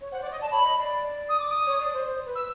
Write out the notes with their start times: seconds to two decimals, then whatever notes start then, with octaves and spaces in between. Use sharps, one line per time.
0.01 C#5
0.12 C5 F#5
0.21 D5
0.25 C#5
0.31 D#5
0.38 D5 A5
0.51 C#5 B5
0.63 D#5
0.77 D5
1.29 D#6
1.39 D6
1.49 D#6
1.67 C#5
1.80 D5
1.94 C5
2.06 C5
2.26 B4
2.35 E6